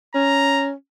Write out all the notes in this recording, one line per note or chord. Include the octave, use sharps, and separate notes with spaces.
C#4 A#5